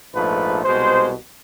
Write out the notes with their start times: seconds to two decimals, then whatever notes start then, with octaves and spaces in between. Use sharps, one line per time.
0.13 A#1 G#2 F3 A3 B4
0.64 C2 B2 G#3 C5